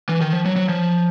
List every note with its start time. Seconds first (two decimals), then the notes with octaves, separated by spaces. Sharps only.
0.09 E3
0.21 D#3
0.33 F3
0.45 F#3
0.56 F#3
0.69 F3